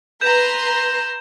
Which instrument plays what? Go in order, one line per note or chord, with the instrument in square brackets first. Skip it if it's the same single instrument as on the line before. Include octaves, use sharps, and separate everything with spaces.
[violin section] B4 A#5 C6 [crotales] G6 E7